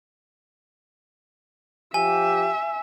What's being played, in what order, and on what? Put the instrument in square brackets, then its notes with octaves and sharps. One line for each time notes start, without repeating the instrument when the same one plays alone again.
[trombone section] F3 G4 [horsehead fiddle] E5 [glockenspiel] G#5